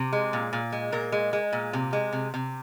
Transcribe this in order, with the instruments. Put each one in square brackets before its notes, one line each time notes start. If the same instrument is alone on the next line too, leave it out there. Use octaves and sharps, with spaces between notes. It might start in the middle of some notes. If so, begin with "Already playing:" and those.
Already playing: [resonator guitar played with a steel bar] C3
G#3
A#2
A#2
G#3
A#2 A#4
G#3
G#3
A#2
C3
G#3
C3
C3